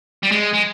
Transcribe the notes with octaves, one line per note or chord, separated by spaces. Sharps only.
G3
G#3
G#3